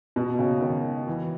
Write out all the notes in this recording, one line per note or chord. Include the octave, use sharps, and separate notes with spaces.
B2
C#3
D#3
E3